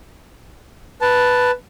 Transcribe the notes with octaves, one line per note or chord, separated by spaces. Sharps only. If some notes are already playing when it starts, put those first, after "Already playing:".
B4 A5